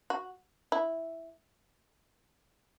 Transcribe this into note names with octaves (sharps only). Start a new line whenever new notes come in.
F#4
E4